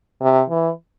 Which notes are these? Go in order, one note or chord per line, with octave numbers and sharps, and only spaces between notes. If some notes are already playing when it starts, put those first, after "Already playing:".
C3
E3